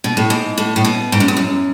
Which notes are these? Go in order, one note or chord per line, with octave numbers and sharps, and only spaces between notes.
B2
A2
G#2
A2
A2
B2
G#2
F#2
E2
F#2